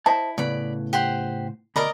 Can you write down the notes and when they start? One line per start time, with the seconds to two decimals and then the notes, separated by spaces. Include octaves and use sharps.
0.06 E4 C5 D#5 A5
0.38 A2 C#3 B3 D5 B5
0.93 G4 C5 F#5
1.76 D2 B2 A#4 D5 D#5 B5